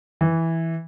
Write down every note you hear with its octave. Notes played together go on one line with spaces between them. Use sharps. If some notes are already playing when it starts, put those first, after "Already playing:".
E3